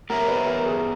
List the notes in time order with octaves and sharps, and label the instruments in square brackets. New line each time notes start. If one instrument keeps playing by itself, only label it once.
[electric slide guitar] B3 G4 C#5 E5 [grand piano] A#4
[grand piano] B4
A#4
G#4